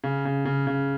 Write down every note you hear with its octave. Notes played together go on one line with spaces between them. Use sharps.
C#3
C#3
C#3
C#3